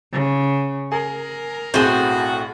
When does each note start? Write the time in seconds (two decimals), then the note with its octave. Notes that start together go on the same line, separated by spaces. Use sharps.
0.12 C#3
0.92 G#4 A#4
1.74 B1 A2 C4 F#4 G#4